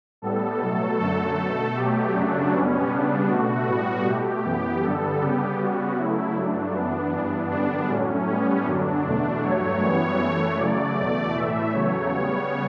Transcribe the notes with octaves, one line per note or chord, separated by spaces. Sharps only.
A2 G3 B3 A4
B2 F#3 A3
F#2 D3 F#3 A3 A4
B2 A3
B2 F#3 A3 G4
F#2 C#3 F#3 A3 D4
B2 G3 B3 C#4
C#3 G3 B3 D4
B2 A3 F#4
A2 G3 B3
B2 A3 G4
F#2 E3 B3
G2 D3 G3 B3 A4
C#3 G3 B3 G4
C#3 G3 B3 F#4
C#3 F#3 A3 E4
G2 F#3 A3 D4
F#2 E3 B3
G2 E3 B3
F#2 D3 G3 B3 D4
A2 F#3 A3 C#4
A2 G3 B3 C#4
F#2 D3 F#3 D4
E2 B2 A3
G2 F#3 A3 C#5
F#2 E3 G3 B3
F#2 E3 A3
C#3 F#3 A3 D5
E2 B2 A3
A2 E3 A3 E5
E2 C#3 F#3 A3 C#5
C#3 G3 B3